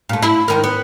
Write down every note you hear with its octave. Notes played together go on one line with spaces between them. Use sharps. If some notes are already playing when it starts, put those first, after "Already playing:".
A#2 A3
E4
G#2 D#3 A#4
B3